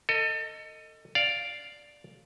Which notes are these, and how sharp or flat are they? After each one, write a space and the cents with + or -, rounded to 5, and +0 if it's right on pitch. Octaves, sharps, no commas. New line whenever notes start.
A4 +30 D#5 +0
D5 +0 F5 +0